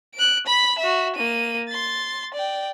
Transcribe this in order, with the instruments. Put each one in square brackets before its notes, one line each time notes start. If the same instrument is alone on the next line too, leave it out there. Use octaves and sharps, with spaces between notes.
[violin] F#6 D7
B5 B6
F#4 E5
A#3 D#7
C6 A6
D5 G5